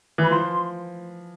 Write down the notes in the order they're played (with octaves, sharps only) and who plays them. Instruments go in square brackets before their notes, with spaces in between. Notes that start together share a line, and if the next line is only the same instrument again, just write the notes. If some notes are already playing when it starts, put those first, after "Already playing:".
[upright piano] E3
[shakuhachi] B5
[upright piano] F3 [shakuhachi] C6